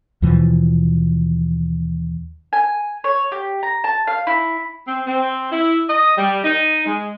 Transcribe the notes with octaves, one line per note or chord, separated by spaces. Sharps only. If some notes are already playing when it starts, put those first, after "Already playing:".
D#2 B2 E3 F3
G#5
C#5
G4
A#5
A5
F5
E4
C4
C4
E4
D#5
G3
D#4
G#3